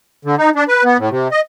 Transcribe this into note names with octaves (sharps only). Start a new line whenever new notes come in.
D3
D#4
D4
B4
B3
A2
C3
D#5